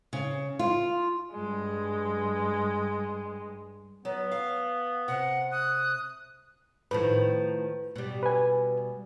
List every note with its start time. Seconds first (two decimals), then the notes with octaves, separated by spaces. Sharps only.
0.13 C#3
0.59 F4
1.33 G2 G#3
4.05 F#3 B3
4.31 F5
5.08 C3 F#5
5.52 D#6 F#6
6.91 A2 D#3 F3 B4
7.96 B2 G3
8.23 B4 G#5